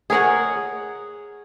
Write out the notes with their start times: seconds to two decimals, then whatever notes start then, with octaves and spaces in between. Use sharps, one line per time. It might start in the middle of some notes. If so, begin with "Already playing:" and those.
0.10 G#4 A#4 C#5 F#5